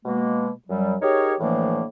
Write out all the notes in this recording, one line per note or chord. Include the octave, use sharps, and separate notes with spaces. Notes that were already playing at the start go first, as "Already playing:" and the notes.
B2 G#3 A#3
F#2 F#3 G3
D#4 G4 G#4 A#4 C#5
A2 D3 E3 F3 A3 A#3